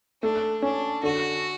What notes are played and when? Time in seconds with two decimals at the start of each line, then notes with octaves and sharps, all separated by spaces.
0.22 A3 D4
0.62 C#4 D4
1.03 D3 F#4